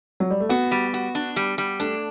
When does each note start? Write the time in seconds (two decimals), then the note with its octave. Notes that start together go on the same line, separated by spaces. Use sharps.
0.20 F#3
0.31 G3
0.40 A3
0.49 B3 F#4
0.71 G3
0.94 F#4
1.15 D4
1.36 G3
1.58 G3
1.80 A3 D4